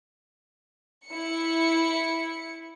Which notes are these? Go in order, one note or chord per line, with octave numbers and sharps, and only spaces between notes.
E4 C#7